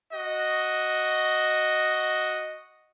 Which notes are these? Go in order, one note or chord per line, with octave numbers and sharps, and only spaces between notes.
F#4 D#5